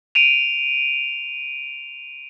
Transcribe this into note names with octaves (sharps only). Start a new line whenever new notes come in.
D7 D#7 F7